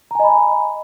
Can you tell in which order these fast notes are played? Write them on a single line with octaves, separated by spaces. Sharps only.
A#5 G#5 D#5 B5